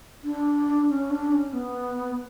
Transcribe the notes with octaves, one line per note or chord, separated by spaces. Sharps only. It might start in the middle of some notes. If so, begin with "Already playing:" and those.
D4
C#4
D4
C#4
B3